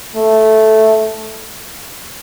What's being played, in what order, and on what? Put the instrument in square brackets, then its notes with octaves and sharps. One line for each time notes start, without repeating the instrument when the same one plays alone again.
[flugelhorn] A3